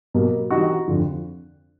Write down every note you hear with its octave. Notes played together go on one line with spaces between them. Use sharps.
B2 F#3 A#3
E3 G3 C4 D#4 F#4
F2 D3 F3